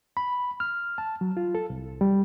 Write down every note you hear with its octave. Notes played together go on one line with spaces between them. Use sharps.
B5
F6
A5
F#3
F4
A4
C2
G3